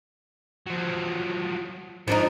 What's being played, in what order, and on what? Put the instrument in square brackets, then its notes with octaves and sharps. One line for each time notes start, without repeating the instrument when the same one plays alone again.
[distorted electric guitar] F3 F#3
[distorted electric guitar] G#2 [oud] F3 D4 D#4